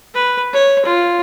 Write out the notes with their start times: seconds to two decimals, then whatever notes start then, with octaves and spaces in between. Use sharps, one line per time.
0.14 B4
0.53 C#5
0.85 F4